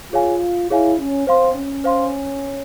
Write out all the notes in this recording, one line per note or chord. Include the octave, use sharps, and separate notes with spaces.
F4 G#4 C#5 F5 G#5
E4 G#4 C#5 F5 G#5
C#4
C4 C5 F5 C6
C#4
C5 F5 C6